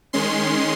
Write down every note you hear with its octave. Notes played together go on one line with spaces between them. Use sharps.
D#3 G#3 C#4 C6